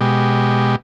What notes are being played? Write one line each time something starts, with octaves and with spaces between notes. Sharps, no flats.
B2 G#3 G4